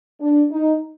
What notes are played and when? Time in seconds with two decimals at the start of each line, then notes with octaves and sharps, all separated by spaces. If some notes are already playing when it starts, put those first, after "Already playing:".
0.19 D4
0.51 D#4